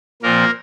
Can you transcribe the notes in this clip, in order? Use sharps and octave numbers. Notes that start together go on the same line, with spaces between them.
A#2 F3 A#3 C4 A#4